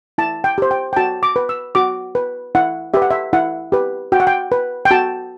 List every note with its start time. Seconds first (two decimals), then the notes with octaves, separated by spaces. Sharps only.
0.18 E4 A5
0.44 G5
0.58 G4 C5
0.71 G5
0.93 G5
0.97 F#4 A5
1.23 D6
1.36 B4
1.49 E6
1.75 F#4 D6
2.15 B4
2.55 E4 F#5
2.94 G4 B4 E5
3.02 F#5
3.11 E5
3.33 E4 F#5
3.72 G4 B4
4.12 F#4 G5
4.20 F#5
4.27 G5
4.52 B4
4.85 G5
4.91 F#4 A5